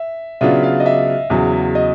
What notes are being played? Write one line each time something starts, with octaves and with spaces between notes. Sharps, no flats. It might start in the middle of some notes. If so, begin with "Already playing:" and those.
Already playing: E5
C#3 F#3 B3 D4 F4 E5
F5
D#5
E5
E2 C#3 F#3
D#5